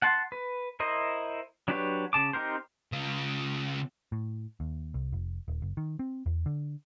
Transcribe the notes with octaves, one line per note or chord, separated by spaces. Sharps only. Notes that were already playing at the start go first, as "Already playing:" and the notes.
F#5 A5 C6
B4
E4 A#4 C5 D#5
F#3 D4 G4 B4 C#5
C#3 A5 D6
C4 D#4 G4 A#4 C5
C#3 F4
A2
D#2
C2
F1
D#1
F#1
D#3
C4
E2
D3